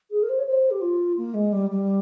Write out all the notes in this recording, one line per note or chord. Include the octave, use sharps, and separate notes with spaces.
G#4
A#4
C5
C#5
C5
G4
F4
A#3
G#3
G3
G3